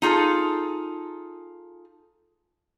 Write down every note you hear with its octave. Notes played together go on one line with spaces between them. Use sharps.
D#4 F4 G#4 A4